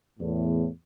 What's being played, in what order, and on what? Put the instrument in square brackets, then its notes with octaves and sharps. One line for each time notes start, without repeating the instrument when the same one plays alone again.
[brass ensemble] E2 A2